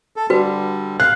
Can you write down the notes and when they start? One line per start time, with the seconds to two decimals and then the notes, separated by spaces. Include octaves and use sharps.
0.16 A4
0.30 D3 G3 F#4 B4
1.00 F5 F#6